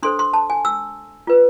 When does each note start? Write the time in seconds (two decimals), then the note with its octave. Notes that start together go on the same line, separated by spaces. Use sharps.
0.03 D4 A4 C5 C6
0.19 C6
0.33 A5
0.50 G#5
0.65 E6
1.27 F4 B4